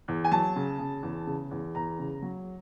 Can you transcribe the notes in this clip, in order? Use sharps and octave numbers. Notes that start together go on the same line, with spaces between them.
E2
G#5
F#3 A5
C#3
C#3
E2
C#3
E2
E2 A#5
C#3
F#3